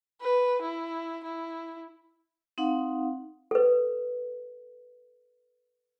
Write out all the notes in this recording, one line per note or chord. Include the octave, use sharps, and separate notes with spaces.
B4
E4
E4
C4 D#4 F5 F#5
A4 B4